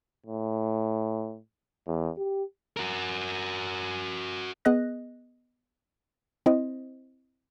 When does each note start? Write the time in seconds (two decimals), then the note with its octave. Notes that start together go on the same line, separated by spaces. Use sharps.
0.26 A2
1.87 E2
2.17 G4
2.77 F#4 A#4
4.65 B3 G#4 D#5 F#6 A#6
6.46 C4 E4 C5 D#5